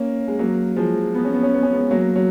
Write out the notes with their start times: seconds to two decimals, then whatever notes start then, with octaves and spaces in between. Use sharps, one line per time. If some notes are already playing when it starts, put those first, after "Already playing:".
Already playing: A#3 C#4
0.28 G#3
0.39 F#3 A#3
0.76 F3 G#3
1.15 B3
1.25 C#4
1.34 B3
1.43 C#4
1.54 B3
1.63 C#4
1.72 G#3 B3
1.91 F#3 A#3
2.16 F#3